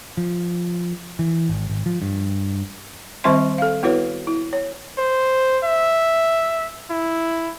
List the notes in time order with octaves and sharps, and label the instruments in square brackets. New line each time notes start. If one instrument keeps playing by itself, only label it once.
[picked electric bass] F3
E3
G#1
G#1
F3
G2
[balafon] D#3 G3 C4 C5 E5 C6
A4 F5
B3 E4 F#4 B4 C#5
E4
C#5
[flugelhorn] C5
E5
E4